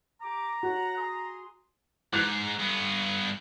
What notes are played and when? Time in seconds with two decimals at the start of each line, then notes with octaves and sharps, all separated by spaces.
0.21 G4 A#5 D6
0.63 F#4 C#5 F#5
0.97 G#4 C6 D#6
2.13 G#2 D6 F#6 F7
2.60 G2 B3